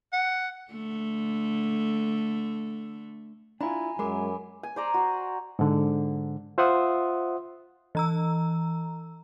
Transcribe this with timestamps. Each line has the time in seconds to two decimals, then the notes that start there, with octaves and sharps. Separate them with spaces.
0.13 F#5
0.71 D3 A3
3.61 D4 E4 F4 G#5 A#5 B5
3.99 F#2 G#3 A#4 B5 D6
4.63 G#5
4.76 C5 D5 A#5
4.94 F#4
5.59 G#2 D3
6.58 F4 C5 E5 F#5 C6 D#6
7.95 E3 A#5 E6